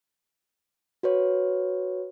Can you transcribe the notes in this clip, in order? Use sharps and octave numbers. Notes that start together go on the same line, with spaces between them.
F#4 B4 C#5